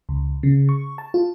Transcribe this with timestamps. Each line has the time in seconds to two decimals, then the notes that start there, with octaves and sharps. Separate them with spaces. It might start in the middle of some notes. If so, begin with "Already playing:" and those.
0.09 C#2
0.43 C#3
0.69 C#6
0.98 A5
1.14 F4